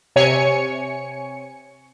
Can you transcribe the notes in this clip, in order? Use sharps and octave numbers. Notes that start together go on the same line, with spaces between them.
C3 C#5 G#5 C#7